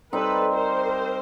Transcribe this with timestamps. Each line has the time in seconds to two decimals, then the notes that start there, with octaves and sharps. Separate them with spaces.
0.13 G3 C4 D#4 A4 B4
0.54 A#4 C5